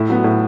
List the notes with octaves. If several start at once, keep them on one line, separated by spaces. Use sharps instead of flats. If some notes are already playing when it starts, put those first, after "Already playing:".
Already playing: A2 E4
F#3 B3
A2